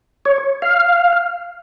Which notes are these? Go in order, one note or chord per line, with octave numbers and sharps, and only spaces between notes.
C#5
F5